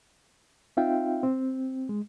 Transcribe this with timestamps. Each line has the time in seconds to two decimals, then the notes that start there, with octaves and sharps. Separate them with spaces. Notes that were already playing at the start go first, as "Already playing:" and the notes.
0.77 C4 D#4 F4 E5 F5 G5
1.23 C4
1.89 G#3